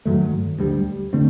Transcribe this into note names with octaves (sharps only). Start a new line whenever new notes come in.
G2 D#3 F#3 A3
D2 D3 G3
D3 A3 C4